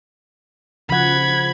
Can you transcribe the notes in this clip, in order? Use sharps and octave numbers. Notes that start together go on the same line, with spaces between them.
C#3 F3 F#5 B5 G#6